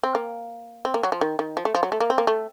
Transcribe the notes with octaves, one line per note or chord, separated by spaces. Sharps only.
C4
A#3
C4
A#3
F#3
F3
D#3
D#3
F3
A3
F3
F#3
A3
A#3
C4
A#3
A3